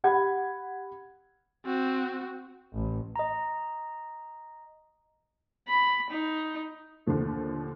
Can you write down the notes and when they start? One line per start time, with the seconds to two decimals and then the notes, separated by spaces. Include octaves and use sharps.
0.04 G4 F#5 B5 G#6
1.66 C4 F#4
2.75 A1
3.16 D#5 A#5
5.69 B5
6.11 D#4
7.06 D#2 A#2 D3 F3 A3